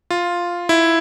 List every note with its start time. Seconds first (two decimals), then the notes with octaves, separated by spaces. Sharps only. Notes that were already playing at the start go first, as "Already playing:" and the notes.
0.10 F4
0.69 E4